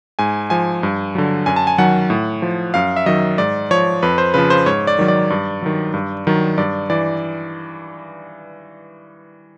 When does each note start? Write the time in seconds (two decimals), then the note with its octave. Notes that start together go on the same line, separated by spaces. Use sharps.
0.19 G#2 G#5
0.50 F3 G#5
0.83 G2
1.15 D3 F#3
1.46 F#2 G#5
1.56 A5
1.67 G#5
1.78 D#3 F#3 F#5
2.10 A2
2.42 F3
2.74 F#2 F5
2.96 E5
3.06 D#3 F#3 D#5
3.38 G#2 D5
3.71 F3 C#5
4.03 F2 B4
4.18 C5
4.34 C#3 F3 B4
4.50 C5
4.66 G#2 C#5
4.87 D5
4.99 D#3 F#3
5.08 D5
5.30 G2
5.62 D#3 F#3
5.94 G2
6.27 D#3 F#3
6.58 G2 D5
6.90 E3 D5